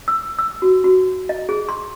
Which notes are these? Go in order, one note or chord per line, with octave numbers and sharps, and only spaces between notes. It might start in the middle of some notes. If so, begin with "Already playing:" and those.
E6
E6
F#4
F#4
D#5
G#4
C6